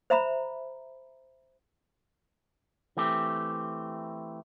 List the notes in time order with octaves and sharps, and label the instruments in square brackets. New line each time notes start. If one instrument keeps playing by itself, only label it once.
[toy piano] C5 E5 A#5 B5
[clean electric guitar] E3 A3 C4 G4